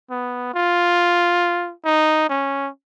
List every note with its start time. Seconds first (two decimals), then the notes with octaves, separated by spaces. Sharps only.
0.10 B3
0.54 F4
1.85 D#4
2.29 C#4